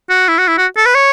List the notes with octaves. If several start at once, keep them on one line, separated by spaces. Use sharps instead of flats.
F#4
E4
F#4
E4
F#4
A4
B4
C#5